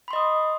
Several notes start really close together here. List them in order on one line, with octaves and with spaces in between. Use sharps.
B5 C6 D#5 D#6